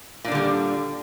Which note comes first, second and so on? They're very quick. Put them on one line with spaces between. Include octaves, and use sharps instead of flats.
A#2 D4 D3 G3